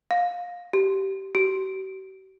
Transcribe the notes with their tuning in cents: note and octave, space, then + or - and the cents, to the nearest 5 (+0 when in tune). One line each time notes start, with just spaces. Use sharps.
F5 +20
G4 -20
G4 -45